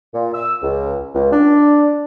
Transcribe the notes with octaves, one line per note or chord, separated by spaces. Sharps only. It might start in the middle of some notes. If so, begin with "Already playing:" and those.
A#2
E6
C#2
C#2
D4